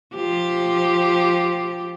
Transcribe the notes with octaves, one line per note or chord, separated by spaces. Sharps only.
F3 G4